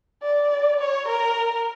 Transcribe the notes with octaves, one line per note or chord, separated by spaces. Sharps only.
D5
C#5
A#4